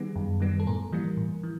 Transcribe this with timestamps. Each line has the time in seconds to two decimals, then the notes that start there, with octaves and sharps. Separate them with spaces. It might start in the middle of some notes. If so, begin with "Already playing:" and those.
Already playing: D#3 G3 B3 G#4
0.16 F#2
0.40 D#3 G3 B3
0.60 A4
0.67 A2 A#4
0.93 E3 G3 A#3
1.17 A2
1.43 E3